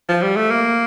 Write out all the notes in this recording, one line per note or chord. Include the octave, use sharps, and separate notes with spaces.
F3
G3
A3
A#3